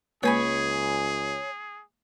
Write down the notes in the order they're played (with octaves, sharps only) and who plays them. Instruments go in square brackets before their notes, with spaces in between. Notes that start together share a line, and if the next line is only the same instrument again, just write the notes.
[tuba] C#2 [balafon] G#3 A#3 B4 [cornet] G#4 [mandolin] C#5 G#5 B5